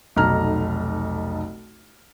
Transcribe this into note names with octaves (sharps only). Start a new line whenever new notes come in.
F1 B1 D#4 A4 A#5 F6